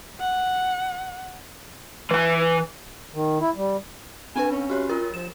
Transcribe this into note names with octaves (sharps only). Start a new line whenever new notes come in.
F#5
E3 G#5
D#3
E4
G3
C4 D4 B4 G#5
C#4
F#4 G4 C#5
F4 A#4
F3 E7